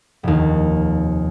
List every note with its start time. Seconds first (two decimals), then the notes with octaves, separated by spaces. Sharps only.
0.23 F1 D#2